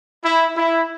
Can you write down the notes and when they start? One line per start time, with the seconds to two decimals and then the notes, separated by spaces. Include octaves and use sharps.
0.25 E4
0.56 E4